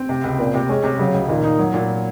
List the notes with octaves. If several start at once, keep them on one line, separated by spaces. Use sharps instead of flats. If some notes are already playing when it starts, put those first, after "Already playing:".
Already playing: C4
C3
C#2
A#2 C4
C3
G#3 C#4
C3
C#3 F#3
C#2
A#2 D#3
D#4
F#3
A#2